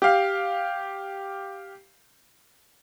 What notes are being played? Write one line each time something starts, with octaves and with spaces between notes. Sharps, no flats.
G4 F5